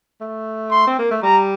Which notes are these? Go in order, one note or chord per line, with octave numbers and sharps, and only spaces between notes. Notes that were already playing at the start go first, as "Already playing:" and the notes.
A3
C6
C4
A#3
A3
G3 A#5